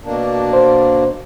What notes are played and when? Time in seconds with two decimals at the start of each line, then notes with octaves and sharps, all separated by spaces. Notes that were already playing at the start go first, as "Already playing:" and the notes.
0.04 B2 A#3 D4
0.53 C5